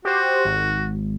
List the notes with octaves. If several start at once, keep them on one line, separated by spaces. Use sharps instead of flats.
F#4 G4 C5
G#1